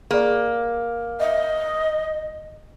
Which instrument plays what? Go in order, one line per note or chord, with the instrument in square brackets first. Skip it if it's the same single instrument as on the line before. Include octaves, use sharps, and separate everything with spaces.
[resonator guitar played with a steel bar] A#3 [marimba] G#4 D5
[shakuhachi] D#5 [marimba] E5